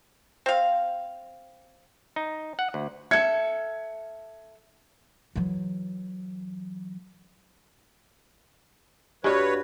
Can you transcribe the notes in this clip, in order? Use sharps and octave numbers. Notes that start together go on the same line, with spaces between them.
C4 F5
D#4
F#5
D2
A4 E5 G#6 C#7
E3 F#3
G2 F#4 B4 C#5